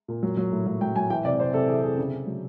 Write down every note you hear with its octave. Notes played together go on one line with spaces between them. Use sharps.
A#2
F#3
F#3
A2
F#3
F#3 G5
F#3 G#5
E3 G5
C3 D5
C3 C5
C3 A4
E3 G#4
C3 G#4
C#3 G#4
C#3
F#3